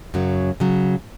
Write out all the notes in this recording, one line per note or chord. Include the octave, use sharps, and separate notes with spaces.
F#2 C#3 F#3
C#3 F#3